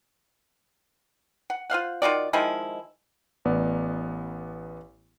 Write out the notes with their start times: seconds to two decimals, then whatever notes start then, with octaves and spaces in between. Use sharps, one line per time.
1.50 F#5
1.70 F4 C5 F5 F#5
2.02 D#3 F4 F#4 D5
2.33 D#3 F3 G#3 E4
3.45 A1 B3 D5